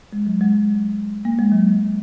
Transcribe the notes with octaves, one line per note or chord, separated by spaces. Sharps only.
G#3
F#3
G#3
A#3
G#3
F#3